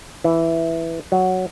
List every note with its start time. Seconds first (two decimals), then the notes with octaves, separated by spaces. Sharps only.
0.24 E3
1.12 F#3